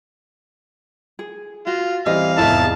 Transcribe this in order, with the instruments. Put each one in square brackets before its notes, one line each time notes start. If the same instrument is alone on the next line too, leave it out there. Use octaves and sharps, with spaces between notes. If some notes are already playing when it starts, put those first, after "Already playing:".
[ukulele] G#4
[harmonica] F4 [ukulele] F#4
[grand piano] E3 G3 C4 [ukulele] D#5 [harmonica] F5
[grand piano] F1 E2 G#2 [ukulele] E4 G#4 E5 [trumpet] A5